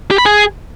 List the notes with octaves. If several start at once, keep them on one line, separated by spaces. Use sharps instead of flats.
G4
B5
G#4